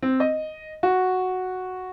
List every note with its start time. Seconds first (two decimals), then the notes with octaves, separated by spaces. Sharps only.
0.02 C4
0.20 D#5
0.83 F#4